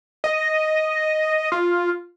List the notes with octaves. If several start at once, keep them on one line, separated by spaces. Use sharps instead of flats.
D#5
F4